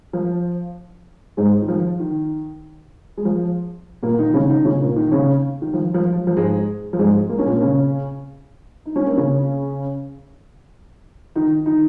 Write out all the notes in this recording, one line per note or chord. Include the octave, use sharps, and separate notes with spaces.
F3
G#2 G#3
D#3
F3
D#3
G#3
F3
A#2 A#3
D#3 D#4
C#3 C#4
D#3 D#4
C#3 C#4
A#2 A#3
D#3 D#4
C#3 C#4
D#3
F3
F3
F3
F3
G#2 G#3
F3
G#2 G#3
A#3
C#4
A#2 A#3
C#3 C#4
D#4
C#4
A#3
C#3 C#4
D#3 D#4
D#3 D#4